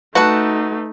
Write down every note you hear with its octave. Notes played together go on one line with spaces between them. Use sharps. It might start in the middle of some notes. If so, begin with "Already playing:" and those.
A3 D#4 F#4 B4 A5